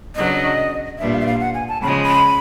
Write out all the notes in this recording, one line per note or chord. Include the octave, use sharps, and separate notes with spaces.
C#3 F#3 B3 D4 D#5
A#2 G3 B3 D4 E5
F5
E5
F5
F#5
G#5
A5
C#3 F3 G#3 B5
B5